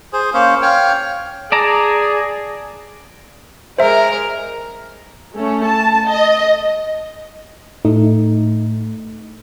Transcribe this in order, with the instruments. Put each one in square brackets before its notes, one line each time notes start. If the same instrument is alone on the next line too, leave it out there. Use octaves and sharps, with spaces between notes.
[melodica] G#4 C5
A#3 C#4 C5
C#5 F5 G5
[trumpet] G#4 [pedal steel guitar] D5 A5 A#5
[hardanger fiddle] G#3 A#4 [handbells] C5 E5
[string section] A3 C#4
A5
D#5
[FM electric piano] A2 A3 D#4